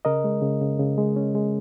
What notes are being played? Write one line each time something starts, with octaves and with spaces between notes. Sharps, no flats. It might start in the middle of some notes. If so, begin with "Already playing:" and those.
C#3 A#4 D#5
G#3
C#3
C#3
C#3
G#3
C#4
G#3